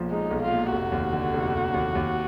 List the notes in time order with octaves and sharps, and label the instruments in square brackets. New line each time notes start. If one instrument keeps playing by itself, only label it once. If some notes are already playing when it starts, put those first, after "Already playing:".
Already playing: [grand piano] B1 A#2 F3
[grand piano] G#3 [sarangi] D#4
[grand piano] B1
[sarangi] F4
[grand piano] A#2
[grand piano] F1 [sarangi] F#4
[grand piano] D#2
D3
F1
F1
D#2
D#2